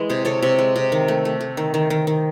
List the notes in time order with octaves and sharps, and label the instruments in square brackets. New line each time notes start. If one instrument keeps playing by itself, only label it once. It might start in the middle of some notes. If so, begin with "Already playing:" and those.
Already playing: [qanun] E3 G#3 D#5
C3 G#4 C5
C3 A4 C#5
C3
G#3
C3
D#3
A3
A3
A3
D#3
D#3
D#3
D#3